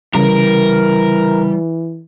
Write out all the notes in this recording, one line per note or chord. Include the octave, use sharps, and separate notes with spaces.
C#3 E3 G3 A#4